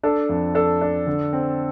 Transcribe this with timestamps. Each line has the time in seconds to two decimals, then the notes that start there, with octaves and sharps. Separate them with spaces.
0.03 D4 A4
0.29 F2
0.55 D4 A4
0.81 D4
1.07 D3
1.33 C4